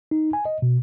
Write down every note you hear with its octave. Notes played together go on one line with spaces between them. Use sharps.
D#4
G#5
D#5
B2